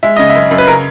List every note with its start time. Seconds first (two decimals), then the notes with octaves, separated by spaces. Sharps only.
0.03 G#3 E5
0.16 C#3 D#5
0.30 E5
0.35 F#2
0.51 F#2
0.58 B4
0.67 C#3 A#4